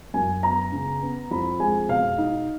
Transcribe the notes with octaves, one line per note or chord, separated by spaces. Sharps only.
F#2 G#5
B3 A#5
C#3
B3
F2 B5
G#3 G#5
B2 F5
D#4